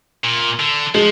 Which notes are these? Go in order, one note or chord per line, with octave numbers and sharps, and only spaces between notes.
A#2
D3
F3 G#3